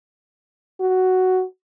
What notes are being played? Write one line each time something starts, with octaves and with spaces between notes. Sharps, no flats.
F#4